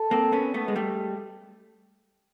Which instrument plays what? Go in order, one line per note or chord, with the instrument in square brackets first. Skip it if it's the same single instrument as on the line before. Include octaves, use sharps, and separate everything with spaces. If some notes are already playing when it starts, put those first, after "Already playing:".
Already playing: [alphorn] A4
[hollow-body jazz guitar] A#3 C4
B3 C#4
A3 B3
G#3
G3 A3